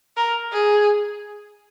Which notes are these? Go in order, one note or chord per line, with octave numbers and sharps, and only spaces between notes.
A#4
G#4